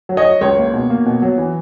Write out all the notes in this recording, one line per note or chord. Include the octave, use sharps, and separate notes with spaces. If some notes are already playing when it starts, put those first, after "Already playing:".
F#3
C#5 D#5
F#3
C#2 C#5
A#3
B2
A#3
B2
F#3
E3